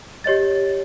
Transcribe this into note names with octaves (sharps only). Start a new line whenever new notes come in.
G4 C#5 D#5 A6